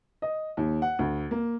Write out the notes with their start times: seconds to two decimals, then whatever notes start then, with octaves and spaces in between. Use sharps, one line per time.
0.22 D#5
0.57 D#2
0.82 F#5
0.99 D2
1.31 A#3